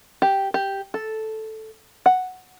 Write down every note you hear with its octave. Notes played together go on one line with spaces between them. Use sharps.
G4
G4
A4
F#5